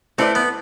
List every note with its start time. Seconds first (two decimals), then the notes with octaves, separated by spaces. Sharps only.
0.18 A3 C4 E4 B4 D5
0.35 B3